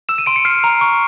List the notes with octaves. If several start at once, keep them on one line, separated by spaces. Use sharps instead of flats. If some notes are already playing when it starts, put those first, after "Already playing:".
E6 E7
D#7
C6 D7
C#7
F6 C7
A#5
C#6